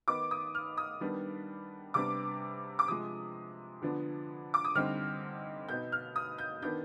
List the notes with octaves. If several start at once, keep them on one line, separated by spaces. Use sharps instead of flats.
D#3 B3 D#4 D6
D#6
F6
D#6
D#3 G3 B3 D4
C3 G3 B3 D4 D6
D6
C3 F3 G#3 D#6
D3 F3 B3 D4
D6
D#6
D3 G3 C4 D#4 F6
B2 B3 D#4 G6
F6
D#6
G6
D#3 B3 D4 G6